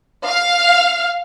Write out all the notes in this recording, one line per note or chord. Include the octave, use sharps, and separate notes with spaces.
F5